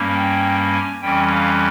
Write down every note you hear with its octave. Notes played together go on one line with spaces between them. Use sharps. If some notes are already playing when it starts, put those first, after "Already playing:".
Already playing: G2 G3 A#3 C#4
G5
G#5
F2 E3 G3 C#4 G5
F5